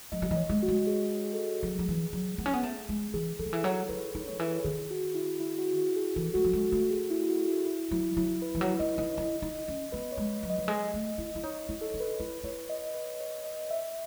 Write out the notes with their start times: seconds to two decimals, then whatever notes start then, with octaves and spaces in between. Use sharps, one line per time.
0.12 F#3 D#5
0.22 F#3
0.31 E3 D#5
0.37 C#5
0.50 G#3
0.63 F#4
0.68 G#3
0.87 G#4
1.25 G#4
1.33 A4
1.40 G#4
1.63 F#3
1.79 F#3
1.88 E3
2.13 F#3
2.38 B3
2.46 C#4
2.54 B3
2.63 A3
2.89 G#3
3.14 E3 G#4
3.39 E3 A4
3.46 D#3
3.53 E3
3.64 F#3 C#5
3.89 E4 B4
4.15 D#4
4.28 D#3 C#5
4.40 E3 B4
4.64 D#3 G#4
4.90 F#4
5.15 E4
5.40 E4
5.58 F#4
5.77 F#4
5.96 G#4
6.16 E3 A4
6.34 G#3 F#4
6.44 F#3
6.53 G#3
6.72 A3 F#4
6.91 G#4
7.10 E4
7.29 F#4
7.48 E4
7.66 E4
7.91 F#3 E4
8.17 F#3 E4
8.42 B4
8.55 E3
8.60 F#3 C#5
8.79 D#4 D#5
8.98 D#4 D#5
9.18 E4
9.42 D#4
9.68 C#4
9.92 B3 B4
10.12 C#5
10.17 G#3
10.43 F#3
10.50 D#5
10.58 F#3
10.68 G#3
10.94 A3
11.18 E4
11.35 E4
11.43 D#4 C#5
11.69 E4
11.81 A4
11.94 D#4
12.00 B4
12.20 E4 B4
12.44 E4 C#5
12.69 D#5
12.94 B4
13.20 C#5
13.44 D#5
13.70 E5